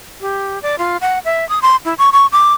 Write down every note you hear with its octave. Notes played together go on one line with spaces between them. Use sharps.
G4
D5
F4
F#5
E5
D#6
C6
E4
C#6
C#6
D6